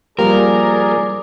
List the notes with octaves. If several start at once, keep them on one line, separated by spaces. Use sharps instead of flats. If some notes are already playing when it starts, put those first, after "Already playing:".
F3 G3 A#3 G#4 A#4 D5